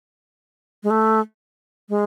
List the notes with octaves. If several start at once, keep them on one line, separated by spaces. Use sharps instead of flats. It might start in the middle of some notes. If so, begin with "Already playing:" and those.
G#3
A3
G#3